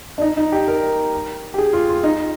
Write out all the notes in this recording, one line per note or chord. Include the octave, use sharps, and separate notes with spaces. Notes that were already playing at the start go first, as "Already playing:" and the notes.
D4
D#4
D#4
G4
A#4
G4
G#4
F4
F4
D#4